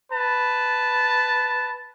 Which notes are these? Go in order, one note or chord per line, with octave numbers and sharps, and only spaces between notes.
B4 A5